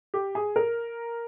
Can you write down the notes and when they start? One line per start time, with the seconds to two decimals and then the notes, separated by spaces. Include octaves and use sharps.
0.14 G4
0.35 G#4
0.56 A#4